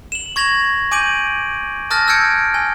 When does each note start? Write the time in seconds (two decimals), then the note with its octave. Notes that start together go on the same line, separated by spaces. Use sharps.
0.12 E7 F#7
0.36 C#6 G#6 A#6 F7 F#7
0.91 G#5 D6 G6 D7 D#7 F#7
1.91 A5 D#6 F6 F#6 A6 A#6
2.08 E6 F6 G6 G#6 C#7 D7
2.54 G#5